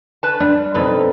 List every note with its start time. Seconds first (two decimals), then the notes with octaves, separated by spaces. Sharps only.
0.23 B4 A5
0.40 G3 D4
0.74 F2 B2 C4 D#4 A4 B4